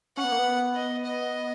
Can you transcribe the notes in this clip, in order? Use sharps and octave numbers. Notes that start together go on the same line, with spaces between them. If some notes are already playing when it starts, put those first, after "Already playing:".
C#4 F#5
B3
A#3
B3
D#5
D#5